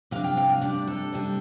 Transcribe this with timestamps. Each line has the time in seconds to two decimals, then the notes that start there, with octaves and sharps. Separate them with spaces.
0.11 C3 G3 D4 F5
0.24 G5
0.37 F5
0.49 F5
0.61 C3 G3 D4 D5
0.87 A4
1.13 C3 G3 D4